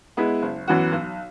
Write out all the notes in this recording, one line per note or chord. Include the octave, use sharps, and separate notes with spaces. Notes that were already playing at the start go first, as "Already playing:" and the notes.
G#3 B3 E4
F#1
F#2 E3 B3 F#4
B1